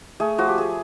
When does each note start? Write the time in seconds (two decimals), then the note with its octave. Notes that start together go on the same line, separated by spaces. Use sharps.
0.20 A3 G#4
0.38 F3 F#4
0.48 G4
0.58 A3 G#4